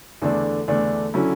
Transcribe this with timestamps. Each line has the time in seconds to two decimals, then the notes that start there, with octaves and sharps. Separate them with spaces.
0.22 E2 D3 A3 D4
0.68 E2 D3 A3 D4
1.14 D3 F#3 C#4 E4